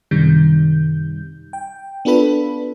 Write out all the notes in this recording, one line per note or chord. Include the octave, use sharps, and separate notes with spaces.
F#2 C3 D#3 G3 G6
G5
B3 D4 F4 A4 B4 B5